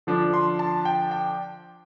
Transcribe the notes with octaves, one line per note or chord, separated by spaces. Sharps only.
D3 F3 D4
C6
A5
G5
G5